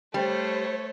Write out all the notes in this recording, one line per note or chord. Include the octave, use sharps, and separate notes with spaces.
G3 A3 C5 C#5